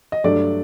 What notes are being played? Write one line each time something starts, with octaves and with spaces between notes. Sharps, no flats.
D#5
G2 F#3 A3 D4 D5